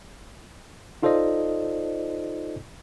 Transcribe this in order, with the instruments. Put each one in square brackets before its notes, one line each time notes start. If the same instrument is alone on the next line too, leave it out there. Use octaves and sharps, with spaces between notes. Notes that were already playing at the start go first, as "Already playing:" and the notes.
[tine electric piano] D#4 F4 A4 C5 D5 D#5